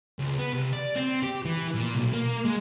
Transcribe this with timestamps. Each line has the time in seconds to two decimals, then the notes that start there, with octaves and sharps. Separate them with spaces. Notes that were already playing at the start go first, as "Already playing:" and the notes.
0.19 C#2
0.38 B3
0.53 C2
0.73 D5
0.95 C4
1.23 G4
1.45 E3
1.75 A#2
1.95 B1
2.13 A#3
2.45 G#3